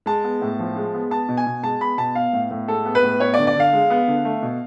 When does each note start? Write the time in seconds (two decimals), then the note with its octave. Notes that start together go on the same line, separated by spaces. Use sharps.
0.06 G#3 A5
0.24 B3
0.42 A2
0.59 F3
0.76 G#3
0.94 B3
1.11 B3 A5
1.29 B2
1.37 G#5
1.47 B2
1.63 G#3 A5
1.81 B3 B5
1.98 B2 A5
2.15 B3 F5
2.33 A2
2.51 A2
2.68 G#3 A4
2.85 B3
2.95 B4
3.03 A2
3.20 B3 C#5
3.34 D5
3.39 D3
3.47 D5
3.56 D3 F5
3.73 G#3
3.90 B3
4.08 D3
4.25 A3
4.43 B2